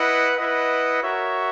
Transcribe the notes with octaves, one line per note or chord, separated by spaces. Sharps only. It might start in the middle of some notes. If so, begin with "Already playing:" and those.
Already playing: E4 B4 D#5 F#5
E4 B4 D#5 F#5
F#4 A#4 C#5 E5